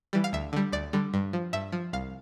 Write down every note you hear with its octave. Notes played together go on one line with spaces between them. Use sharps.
E3 G3
F5
D2 E5
D3 G3
D2 D5
D3 G3
G2
F3
G2 E5
F3
C2 F5